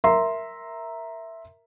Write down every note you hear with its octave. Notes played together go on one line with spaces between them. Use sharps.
A#4 E5 A#5 C6